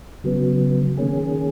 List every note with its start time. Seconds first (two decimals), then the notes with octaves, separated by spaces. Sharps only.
0.24 C#3 F#3 B3
0.97 D#3 A#3 C#4 G#4